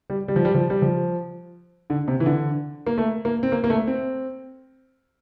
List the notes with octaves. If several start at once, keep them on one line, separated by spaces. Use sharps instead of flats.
G3
G3
F3
G3
F3
G3
F3
D3
C3
E3
D3
A#3
A3
A#3
C4
A#3
A#3
A3
C4